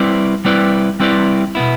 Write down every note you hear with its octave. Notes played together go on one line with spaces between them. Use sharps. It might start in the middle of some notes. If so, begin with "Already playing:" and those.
Already playing: G3 C4 E4 B4 D5
G3 C4 E4 B4 D5
G3 C4 E4 B4 D5
B2 B3 E4